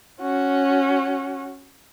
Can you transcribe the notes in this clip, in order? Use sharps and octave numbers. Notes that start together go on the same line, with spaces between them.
C#4 F#4